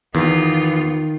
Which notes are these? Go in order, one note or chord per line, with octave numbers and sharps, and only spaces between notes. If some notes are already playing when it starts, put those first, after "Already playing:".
E2 D#3 B3 F4